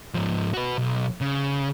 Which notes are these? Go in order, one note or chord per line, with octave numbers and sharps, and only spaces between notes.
G#2 F3
F#4 B4
B1
C#3